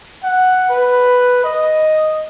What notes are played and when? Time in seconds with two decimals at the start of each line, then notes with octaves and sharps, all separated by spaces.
0.24 F#5
0.70 B4
1.44 D#5